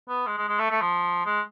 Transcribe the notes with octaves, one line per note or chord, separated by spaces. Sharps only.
B3
G#3
G#3
G#3
A3
A3
F3
G#3